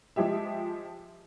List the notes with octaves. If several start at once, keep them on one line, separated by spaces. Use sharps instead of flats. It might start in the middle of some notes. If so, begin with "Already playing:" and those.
F3 G#3 G4 E5